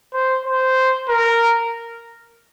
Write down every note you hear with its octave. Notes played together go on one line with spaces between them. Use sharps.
C5
C5
A#4